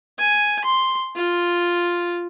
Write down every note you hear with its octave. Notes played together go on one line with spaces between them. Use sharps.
G#5
C6
F4